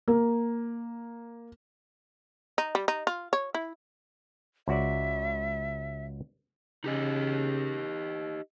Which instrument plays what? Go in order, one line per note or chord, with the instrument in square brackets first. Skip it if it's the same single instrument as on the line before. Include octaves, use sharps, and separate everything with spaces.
[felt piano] A#3
[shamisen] D#4
G3
D#4
F4
C#5
E4
[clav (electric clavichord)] C#2 F#4 D5 [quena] E5
[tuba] C#3 [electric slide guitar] D#4 G4 D#5